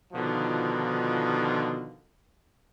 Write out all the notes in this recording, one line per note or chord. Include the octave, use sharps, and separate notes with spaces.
B2 D3 D#3 F3 D#4 F4